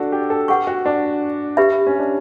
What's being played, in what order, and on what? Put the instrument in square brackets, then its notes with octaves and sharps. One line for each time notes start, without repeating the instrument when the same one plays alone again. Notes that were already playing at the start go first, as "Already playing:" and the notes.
Already playing: [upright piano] D4 F#4 A4
G4
A4
[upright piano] G4 [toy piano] B4 F#5 C#6
[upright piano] F#4
D4
[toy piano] G4 B4 E5 B5
[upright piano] C#4
D4